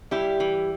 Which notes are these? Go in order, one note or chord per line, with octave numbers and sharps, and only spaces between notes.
G3 E4 G4
E3